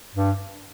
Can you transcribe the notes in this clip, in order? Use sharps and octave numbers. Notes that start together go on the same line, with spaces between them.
G2